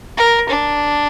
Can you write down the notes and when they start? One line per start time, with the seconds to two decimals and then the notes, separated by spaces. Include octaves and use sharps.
0.17 A#4
0.49 D4